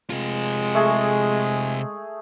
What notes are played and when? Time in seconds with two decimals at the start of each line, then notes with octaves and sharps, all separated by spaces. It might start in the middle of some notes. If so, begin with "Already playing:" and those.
0.10 C3 G#3 F4
0.75 A3 G#4